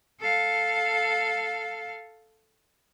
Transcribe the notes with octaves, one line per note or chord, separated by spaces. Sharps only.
A4 F5